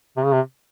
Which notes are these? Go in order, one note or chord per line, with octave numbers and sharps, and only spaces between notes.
C3
C#3
C3